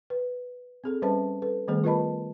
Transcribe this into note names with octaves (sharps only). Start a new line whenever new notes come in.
B4
C4 G#4 A4
G3 C#4 B4 C5 E5 A5
A4 B4
D#3 G3 A3 B3 G#4 C5
F4 A#4 B4 D#5 A5 B5